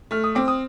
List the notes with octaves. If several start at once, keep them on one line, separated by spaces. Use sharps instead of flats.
A3 F6
D#6
C4 D6
D#6